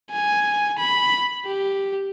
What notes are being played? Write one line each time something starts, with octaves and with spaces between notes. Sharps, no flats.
G#5
B5
G4